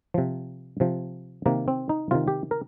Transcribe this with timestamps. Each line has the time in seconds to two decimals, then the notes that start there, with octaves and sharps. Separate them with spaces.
0.14 C3 F3
0.80 C3 F3
1.46 C3 D#3 A#3
1.68 C4
1.89 D#4
2.11 C3 D#3 F4
2.28 G4
2.51 A#4